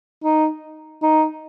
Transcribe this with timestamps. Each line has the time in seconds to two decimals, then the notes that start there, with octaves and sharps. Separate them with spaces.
0.23 D#4
1.02 D#4